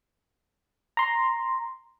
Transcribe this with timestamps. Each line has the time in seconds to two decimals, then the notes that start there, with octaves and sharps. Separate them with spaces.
0.97 A#5 C6